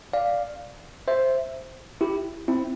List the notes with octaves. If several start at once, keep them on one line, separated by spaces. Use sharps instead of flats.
D5 F5
C5 E5
E4 G4
C4 E4